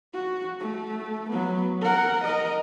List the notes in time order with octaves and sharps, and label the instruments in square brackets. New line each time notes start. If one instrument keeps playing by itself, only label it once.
[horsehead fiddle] F#4
A3
F#3 B3
A#4 F#5
A#4 D#5